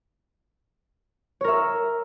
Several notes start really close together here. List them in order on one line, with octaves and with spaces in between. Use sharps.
C#5 A#4 E5